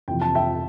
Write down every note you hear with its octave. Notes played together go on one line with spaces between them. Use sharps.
F2 C3 E3 G5
A5
E5 G5